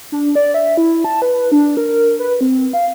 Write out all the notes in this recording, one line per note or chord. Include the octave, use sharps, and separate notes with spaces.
D4
D5
E5
E4
A5
B4
D4
A#4
B4
C4
F5